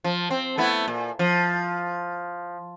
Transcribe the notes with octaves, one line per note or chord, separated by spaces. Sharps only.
F3
C4
A3 B3 E4
A#2
F3